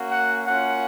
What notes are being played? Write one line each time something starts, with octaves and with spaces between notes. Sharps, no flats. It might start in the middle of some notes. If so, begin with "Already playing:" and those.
Already playing: A#3 C#4 F#4
F#5
A#3 C#4 F4 F#5